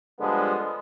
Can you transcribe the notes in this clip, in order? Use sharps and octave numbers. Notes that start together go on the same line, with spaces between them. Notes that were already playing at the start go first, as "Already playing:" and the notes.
G2 D3 F3 G#3 B3